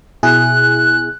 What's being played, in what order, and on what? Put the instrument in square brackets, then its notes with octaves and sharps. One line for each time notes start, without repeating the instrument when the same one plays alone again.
[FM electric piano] B2 E4 G#4 [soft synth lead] F#6